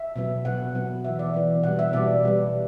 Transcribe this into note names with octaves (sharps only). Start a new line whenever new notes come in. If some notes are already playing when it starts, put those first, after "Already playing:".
Already playing: E5
B2 F#3 B3
B2 F#3 B3 F#5
B2 F#3 B3
E3 B3 E5
D5
E3 B3
B2 G3 B3 F#5
E5
B2 G3 B3 D5
B2 G3 B3